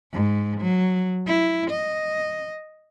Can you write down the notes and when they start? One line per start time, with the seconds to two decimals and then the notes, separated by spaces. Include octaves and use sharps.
0.13 G#2
0.61 F#3
1.27 E4
1.71 D#5